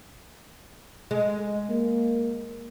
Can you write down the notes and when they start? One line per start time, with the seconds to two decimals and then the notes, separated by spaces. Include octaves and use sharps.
1.11 G#3
1.70 A#3